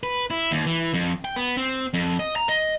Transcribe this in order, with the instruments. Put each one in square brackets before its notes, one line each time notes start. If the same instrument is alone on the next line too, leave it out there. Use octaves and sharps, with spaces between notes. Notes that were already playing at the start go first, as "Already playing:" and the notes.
[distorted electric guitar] B4
E4
D#2
E3
F2
G5
B3
C4
F2
D#5
A#5
D#5